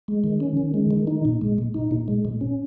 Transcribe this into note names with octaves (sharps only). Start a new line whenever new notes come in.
G#3
D#3
C#4
D#3
G#3
D#3
D#4
A#2
G#3
A#2
D#4
A#2
G#3
A#2
C#4